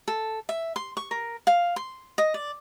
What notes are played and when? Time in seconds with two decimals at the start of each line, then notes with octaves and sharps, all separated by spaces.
0.08 A4
0.49 E5
0.76 C6
0.97 C#6
1.11 A#4
1.47 F5
1.76 C6
2.18 D#5
2.34 D5